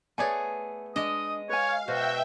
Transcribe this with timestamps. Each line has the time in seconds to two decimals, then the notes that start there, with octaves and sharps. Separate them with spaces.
0.18 A3 B3 G#4 C#5 D5 G#5
0.96 G#3 D4 D#5 D#6
1.49 B4 C#5 F5 G#5
1.88 B2 F#4 C5 E5 G5